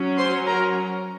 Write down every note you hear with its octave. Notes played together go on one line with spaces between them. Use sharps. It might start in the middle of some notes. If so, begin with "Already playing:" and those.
Already playing: F#3 C#4
C5 C6
A#4 A#5